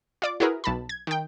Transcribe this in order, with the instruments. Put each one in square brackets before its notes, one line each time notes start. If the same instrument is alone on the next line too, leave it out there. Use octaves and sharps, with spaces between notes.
[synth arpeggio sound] F4 D5 D6
E4 F#4 G#4 A#4 B4
B1 A5 B5
G#6
D#3 G5